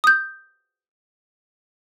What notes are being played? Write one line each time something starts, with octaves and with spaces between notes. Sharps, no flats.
D#6 G6